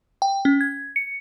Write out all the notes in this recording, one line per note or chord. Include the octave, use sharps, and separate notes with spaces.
G5
C#4
G#6
C#7